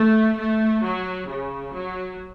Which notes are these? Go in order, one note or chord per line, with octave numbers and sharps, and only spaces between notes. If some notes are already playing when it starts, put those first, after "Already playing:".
Already playing: A3
A3
F#3
C#3
F#3